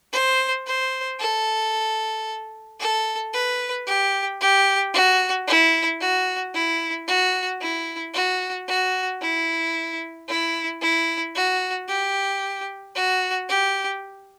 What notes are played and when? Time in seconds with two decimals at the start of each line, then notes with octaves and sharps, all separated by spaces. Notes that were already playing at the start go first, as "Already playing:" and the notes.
0.13 C5
0.66 C5
1.20 A4
2.80 A4
3.33 B4
3.87 G4
4.40 G4
4.94 F#4
5.47 E4
6.01 F#4
6.54 E4
7.08 F#4
7.61 E4
8.14 F#4
8.68 F#4
9.21 E4
10.28 E4
10.81 E4
11.35 F#4
11.88 G4
12.95 F#4
13.49 G4